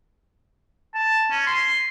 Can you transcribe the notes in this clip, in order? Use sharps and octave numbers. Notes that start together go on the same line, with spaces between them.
A5
C#4
C6